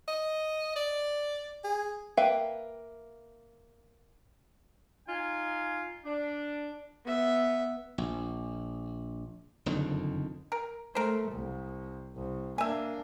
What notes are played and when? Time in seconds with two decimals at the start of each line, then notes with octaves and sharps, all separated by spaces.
0.08 D#5
0.76 D5
1.64 G#4
2.17 A#3 B4 E5 F5 G5
5.08 D#4 F4 G#5
6.05 D4
7.05 B3 E5
7.98 A#1
9.66 F#1 F2 D3 D#3
10.52 A#4
10.95 A3 A#4 C5
11.31 C2
12.16 C2
12.58 A#3 D4 E5 G#5